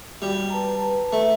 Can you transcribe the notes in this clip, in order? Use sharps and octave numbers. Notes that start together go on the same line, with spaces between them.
G3 F#4 G5
B4 A5 A#5
A3